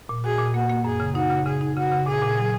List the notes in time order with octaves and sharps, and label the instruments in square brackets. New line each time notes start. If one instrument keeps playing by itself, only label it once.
[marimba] A#2
[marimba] F#4 [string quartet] G#4
[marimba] A#2
[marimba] A#3 [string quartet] F#4
[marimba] A#3
[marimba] F#2 [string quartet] G#4
[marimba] C#3
[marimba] D#4 [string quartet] F#4
[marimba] C#3
[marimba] C#3 [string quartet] G#4
[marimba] D#4
[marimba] C#3 [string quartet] F#4
[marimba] C#3
[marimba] A#2 [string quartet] G#4
[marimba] A#2
F#3